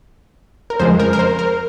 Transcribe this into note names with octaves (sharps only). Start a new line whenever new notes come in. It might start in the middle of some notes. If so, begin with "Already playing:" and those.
A#4
F2 C#3 F3 G#3 C5
A#4
A#4
C5
A#4